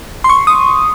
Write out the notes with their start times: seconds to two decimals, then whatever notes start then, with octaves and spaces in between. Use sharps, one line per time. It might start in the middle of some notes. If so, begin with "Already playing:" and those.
0.24 C6
0.29 C#6
0.47 D#6